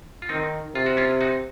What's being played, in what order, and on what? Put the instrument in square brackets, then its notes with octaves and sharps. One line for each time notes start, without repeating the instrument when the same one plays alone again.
[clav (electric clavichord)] F4
[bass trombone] D#3 [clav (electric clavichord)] C4 D#4
[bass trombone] C3 [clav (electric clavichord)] F4
[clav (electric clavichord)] F#4
C#4 F4
D#4 F#4